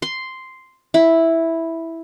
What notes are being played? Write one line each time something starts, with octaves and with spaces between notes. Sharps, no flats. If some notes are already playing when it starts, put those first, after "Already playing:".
C6
E4